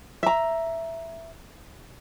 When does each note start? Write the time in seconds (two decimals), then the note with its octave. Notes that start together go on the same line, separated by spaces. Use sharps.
0.23 E5 A#5